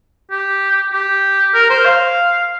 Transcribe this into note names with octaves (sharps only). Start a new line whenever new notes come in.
G4
G4
A#4
C5
F5